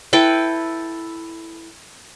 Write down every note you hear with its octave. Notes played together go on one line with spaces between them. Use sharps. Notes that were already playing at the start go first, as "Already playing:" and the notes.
E4 A4 B4 G5